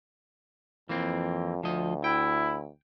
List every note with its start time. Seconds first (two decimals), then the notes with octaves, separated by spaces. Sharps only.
0.89 F2 E3 A#3 C4
1.63 D2 F3 D#5
2.04 E4 G5